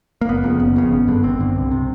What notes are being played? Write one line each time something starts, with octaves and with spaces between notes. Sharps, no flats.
A#3
F#1 B3
F2 C#3
F#1
F2 C#3
G#1
G2 D3
G#1 C4
G2 D3
C2
C3